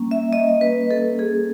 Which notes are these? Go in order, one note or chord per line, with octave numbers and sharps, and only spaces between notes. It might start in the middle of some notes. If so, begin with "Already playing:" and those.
Already playing: G3 A#3 C#4
E5
D#5
B4
A4
G#4